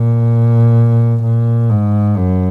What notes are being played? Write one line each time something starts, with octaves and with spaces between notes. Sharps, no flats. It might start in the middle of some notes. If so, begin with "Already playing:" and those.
Already playing: A#2
A#2
G#2
F#2